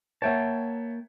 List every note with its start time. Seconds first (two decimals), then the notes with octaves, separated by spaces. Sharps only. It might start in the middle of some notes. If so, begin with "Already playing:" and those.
0.22 A#3 C#5 E5 F#5 G5 A5